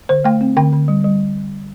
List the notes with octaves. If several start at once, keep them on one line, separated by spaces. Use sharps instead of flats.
D3 C5
A3 G5
C4
D3 G5
D3
G3
G3